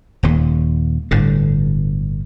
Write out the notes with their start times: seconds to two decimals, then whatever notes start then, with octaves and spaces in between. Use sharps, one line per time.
0.23 D#1 D#2
1.11 G1 A2 D3